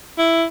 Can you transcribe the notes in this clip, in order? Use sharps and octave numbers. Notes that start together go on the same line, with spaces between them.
E4